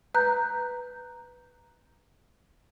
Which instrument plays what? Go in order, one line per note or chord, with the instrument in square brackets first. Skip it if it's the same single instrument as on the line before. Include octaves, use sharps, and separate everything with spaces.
[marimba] B4 A#5 F#6 G6